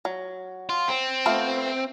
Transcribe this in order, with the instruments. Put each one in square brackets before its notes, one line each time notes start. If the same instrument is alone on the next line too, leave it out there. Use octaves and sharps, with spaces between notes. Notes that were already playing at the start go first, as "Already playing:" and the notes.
[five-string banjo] F#3
[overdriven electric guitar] F4
C4
[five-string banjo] A3 B3 F4